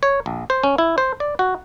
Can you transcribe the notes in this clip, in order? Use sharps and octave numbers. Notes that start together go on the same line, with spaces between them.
C#5
A#1
C5
C#4
E4
C5
D5
F#4